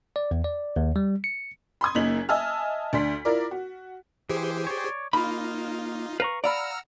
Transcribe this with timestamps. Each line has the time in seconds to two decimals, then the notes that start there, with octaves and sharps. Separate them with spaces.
0.16 D5
0.31 E2
0.44 D5
0.76 D#2
0.96 G3
1.24 C#7
1.81 B5 C6 D#6 G#6
1.95 F#1 F#2 A#3 D#4 B6 F#7
2.29 D#5 E5 G#5 A5 E6 F6
2.93 D2 D4 C6 B6
3.25 E4 F4 A#4 D5
3.51 F#4
4.29 E3 G4 G#4 C5
4.67 C#5 D5
5.13 A#3 D#4 F4 B5
6.20 B4 F5 A#5 C#6
6.44 D5 F5 F#5 A#5 B5 E6 F6